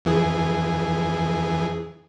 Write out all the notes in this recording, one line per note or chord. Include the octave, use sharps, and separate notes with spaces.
F2 E3 G#4